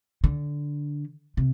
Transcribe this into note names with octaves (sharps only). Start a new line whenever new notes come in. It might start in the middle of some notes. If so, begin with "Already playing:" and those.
D3
C3